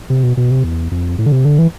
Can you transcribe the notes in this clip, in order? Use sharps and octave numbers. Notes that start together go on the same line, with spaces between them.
C3
B2
B2
C3
E2
F2
A2
D3
C3
D3
E3